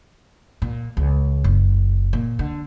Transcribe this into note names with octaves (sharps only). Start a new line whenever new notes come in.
A#2
C#2
F#1
A#2
D3